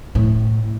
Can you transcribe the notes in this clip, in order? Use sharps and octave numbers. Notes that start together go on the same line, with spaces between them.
A2